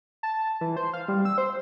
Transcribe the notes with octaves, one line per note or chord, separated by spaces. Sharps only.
A5
E3
C5
F5
G3
E6
C5